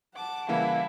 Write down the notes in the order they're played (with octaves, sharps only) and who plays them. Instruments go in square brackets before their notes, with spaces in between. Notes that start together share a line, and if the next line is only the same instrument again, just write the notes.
[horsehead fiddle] F#5 A5 [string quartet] D6
[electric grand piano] C#3 E3 A#3 [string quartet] G3 E4 [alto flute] F5